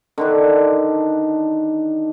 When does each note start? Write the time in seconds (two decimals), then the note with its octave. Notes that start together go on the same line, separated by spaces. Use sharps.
0.18 D3 D#3 D4